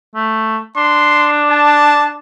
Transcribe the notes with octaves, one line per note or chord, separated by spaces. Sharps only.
A3
D4 C6
A5